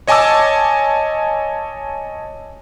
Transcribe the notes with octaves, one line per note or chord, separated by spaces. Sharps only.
C#5 D#5 G#5 A5 D6 E6